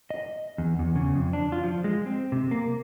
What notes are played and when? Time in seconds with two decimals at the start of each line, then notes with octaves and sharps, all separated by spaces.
0.10 D#5
0.58 E2
0.79 E2
0.96 C#3
1.16 F2
1.33 D4
1.52 F4
1.64 F3
1.84 G#3
2.06 C4
2.32 C3
2.51 A#3